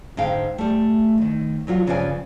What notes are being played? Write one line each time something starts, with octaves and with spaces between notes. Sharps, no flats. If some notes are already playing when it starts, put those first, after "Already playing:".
G#2 D3 F5 G5
G3 A3
D#2 D#3
A#2 F#3 F4 F#4
G2 C#3 F3 B4 D5 G#5